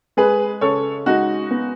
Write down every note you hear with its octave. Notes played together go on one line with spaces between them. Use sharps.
G#3 G#4 B4
C#3 A4 C#5
G#3 D#4 F#4
B3